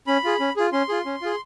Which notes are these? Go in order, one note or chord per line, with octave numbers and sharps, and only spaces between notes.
C#4 B5
F4 G#4
C#4
F4 G#4
C#4 C6
F4 G#4
C#4
F4 G#4